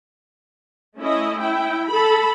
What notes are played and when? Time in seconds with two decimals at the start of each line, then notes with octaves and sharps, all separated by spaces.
0.97 A3 C#4 E4 D#5
1.40 E4 G5
1.87 A4 B5